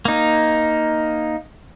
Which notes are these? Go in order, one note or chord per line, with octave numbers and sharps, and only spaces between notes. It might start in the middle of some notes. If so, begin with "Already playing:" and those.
A#3 D#4